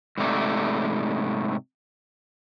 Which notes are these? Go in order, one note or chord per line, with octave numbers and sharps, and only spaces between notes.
G#2 C3 A3 D5